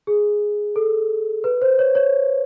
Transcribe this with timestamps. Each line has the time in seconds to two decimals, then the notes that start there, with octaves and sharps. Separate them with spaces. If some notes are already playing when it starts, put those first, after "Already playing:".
0.07 G#4
0.76 A4
1.44 B4
1.62 C5
1.79 C#5
1.95 C#5